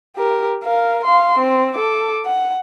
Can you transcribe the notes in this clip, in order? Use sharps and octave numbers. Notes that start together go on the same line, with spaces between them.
G4 A#4
A#4 F5
F5 C6
C4
A4 D6
F#5